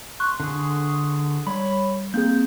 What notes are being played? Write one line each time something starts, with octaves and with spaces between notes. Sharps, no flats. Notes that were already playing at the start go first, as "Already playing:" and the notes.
C6 C#6 F#6
D3 G#4
G3 C#5 B5
A#3 C4 G#4 G6